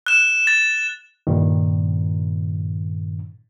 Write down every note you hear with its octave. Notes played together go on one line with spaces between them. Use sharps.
F#6 E7
A6
G2 A#2 D#3